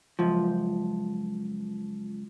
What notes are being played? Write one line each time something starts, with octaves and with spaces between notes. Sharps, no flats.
C#2 F#2 F3